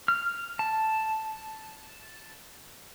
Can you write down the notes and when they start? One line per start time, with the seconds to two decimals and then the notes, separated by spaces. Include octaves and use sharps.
0.08 F6
0.59 A5